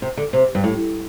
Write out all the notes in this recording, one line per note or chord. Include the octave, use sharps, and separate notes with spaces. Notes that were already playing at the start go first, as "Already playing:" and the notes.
C3
D3
C3
G2
A2